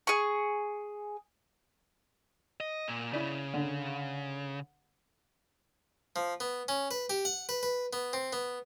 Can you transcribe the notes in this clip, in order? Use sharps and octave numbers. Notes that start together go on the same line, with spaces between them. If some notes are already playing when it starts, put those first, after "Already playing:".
G#4 C#6
D#5
A#2
C#3 E4 D5
D3
F3
B3
C#4
B4
G4
F#5
B4
B4
B3
C4
B3